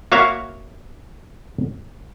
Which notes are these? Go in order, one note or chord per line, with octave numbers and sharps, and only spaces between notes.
A#3 F#4 C#5 E5 F5